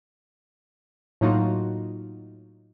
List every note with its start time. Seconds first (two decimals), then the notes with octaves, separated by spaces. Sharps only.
1.21 A2 F#3 A#3 D#4 F4 F#4